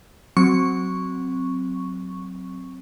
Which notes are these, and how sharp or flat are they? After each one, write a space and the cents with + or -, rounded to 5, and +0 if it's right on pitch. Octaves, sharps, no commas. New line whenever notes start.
F#3 +0 C4 +0 C#6 +0